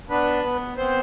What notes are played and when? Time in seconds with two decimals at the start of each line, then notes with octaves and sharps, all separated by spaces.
0.10 B3 D4 B4
0.44 B3
0.77 B3 C4 C5